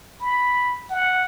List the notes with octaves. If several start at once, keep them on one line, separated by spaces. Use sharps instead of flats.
B5
F#5